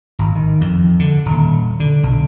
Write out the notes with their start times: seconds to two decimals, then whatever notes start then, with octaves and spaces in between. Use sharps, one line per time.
0.19 G#1
0.35 D#3
0.61 F2
0.99 D3
1.25 D#1
1.80 D3
2.03 B1